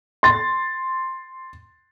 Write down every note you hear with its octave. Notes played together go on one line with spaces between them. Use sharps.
C6 A6